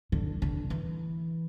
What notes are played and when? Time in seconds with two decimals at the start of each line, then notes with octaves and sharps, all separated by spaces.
0.12 D3
0.42 D3
0.70 E3